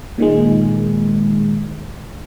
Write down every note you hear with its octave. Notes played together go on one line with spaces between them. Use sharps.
A#2 D#3 G#3